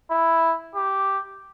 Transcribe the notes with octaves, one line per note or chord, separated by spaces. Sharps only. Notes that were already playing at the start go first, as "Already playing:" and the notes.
E4
G4